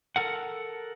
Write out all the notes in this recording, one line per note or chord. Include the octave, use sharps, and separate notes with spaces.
A4 A#4 F#5